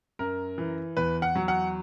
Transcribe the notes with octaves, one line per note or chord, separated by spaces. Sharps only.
F#2 A#4
E3
E2 B4
F#5
F#3
F#5